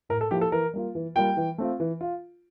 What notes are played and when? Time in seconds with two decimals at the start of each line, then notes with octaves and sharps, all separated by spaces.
0.09 A2 A#4
0.21 A4
0.31 F3 A#3 E4 G4
0.41 A4
0.52 E3 A#4
0.73 G3 A#3 F4
0.95 E3
1.15 G3 A#3 F4 G5
1.37 E3
1.58 A3 C4 F4
1.80 E3
2.01 F4